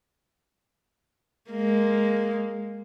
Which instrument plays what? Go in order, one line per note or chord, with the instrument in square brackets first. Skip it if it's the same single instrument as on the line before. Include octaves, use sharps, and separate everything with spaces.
[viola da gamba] G#3 A#3